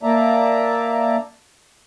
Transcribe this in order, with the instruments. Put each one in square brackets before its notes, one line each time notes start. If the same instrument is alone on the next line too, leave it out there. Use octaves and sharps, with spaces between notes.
[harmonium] A#3 D5 E5 A5 A#5